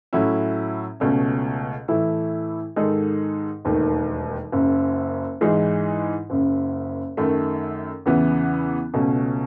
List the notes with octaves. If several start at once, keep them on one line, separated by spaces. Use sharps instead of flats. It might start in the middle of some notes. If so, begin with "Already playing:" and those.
A2 F#3 C#4 E4
C#2 B2 A3 C#4
A2 E3 A3 E4
G#2 D#3 G#3 D#4 A4
E1 D#2 D#3 A3
F#1 F#2 C#3
G#2 E3 G#3 D#4 G#4
F#1 F#2 C#3
F#2 D#3 A3
E2 C#3 E3 B3
C#2 B2 A3 C#4